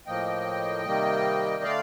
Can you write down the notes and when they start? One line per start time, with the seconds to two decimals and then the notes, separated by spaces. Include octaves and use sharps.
0.07 A2 F3 A#3 D#5 G5
0.85 C3 D#3 G3 A#3
1.63 D3 A3 D5 F5